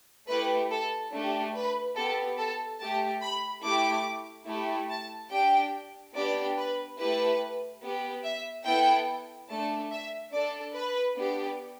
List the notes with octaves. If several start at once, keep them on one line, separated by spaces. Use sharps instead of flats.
A3 E4 G4 B4
A4
A3 D4 G4
B4
B3 G4 A4
A4
A3 G4 A5
B5
A3 E4 G4 D6
A3 E4 G4
A5
D4 G4 G5
B3 D4 G4 D5
B4
A3 E4 G4 B4
B3 G4
E5
B3 E4 A4 G5
A3 D4 A4 A5
E5
D4 A4 D5
B4
B3 D4 G4